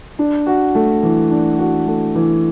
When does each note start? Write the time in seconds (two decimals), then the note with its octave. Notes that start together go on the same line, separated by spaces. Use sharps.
0.19 D4
0.47 F#4
0.75 A3
1.03 E3
1.31 D4
1.59 F#4
1.87 A3
2.15 E3